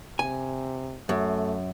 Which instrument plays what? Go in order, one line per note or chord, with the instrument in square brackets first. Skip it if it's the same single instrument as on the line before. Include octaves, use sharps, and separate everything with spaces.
[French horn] C3 [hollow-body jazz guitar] G#5
[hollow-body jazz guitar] F#2 [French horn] A3